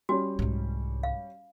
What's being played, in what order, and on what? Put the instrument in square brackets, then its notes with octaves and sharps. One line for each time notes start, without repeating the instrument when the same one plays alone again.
[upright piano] G3 C#4 [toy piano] F#4
[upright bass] C2 G#2
[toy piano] F5